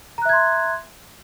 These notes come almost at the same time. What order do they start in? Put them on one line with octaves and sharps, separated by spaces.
A#5 F#6 E5 G#6 C6